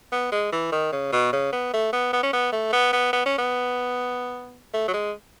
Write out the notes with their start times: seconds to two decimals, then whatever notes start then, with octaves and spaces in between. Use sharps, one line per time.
0.12 B3
0.32 G#3
0.53 E3
0.72 D#3
0.92 C#3
1.13 B2
1.33 C#3
1.52 B3
1.73 A3
1.93 B3
2.13 B3
2.23 C#4
2.33 B3
2.53 A3
2.73 B3
2.93 B3
3.13 B3
3.26 C#4
3.38 B3
4.74 A3
4.88 F#3
4.93 G#3